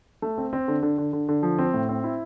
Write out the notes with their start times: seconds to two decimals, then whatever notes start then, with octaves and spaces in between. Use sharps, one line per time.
0.22 A3
0.38 C4
0.53 C4
0.68 D3
0.83 D3
0.98 D3
1.13 D3
1.29 D3
1.43 F3
1.59 C4
1.74 A2
1.89 C4
2.04 E4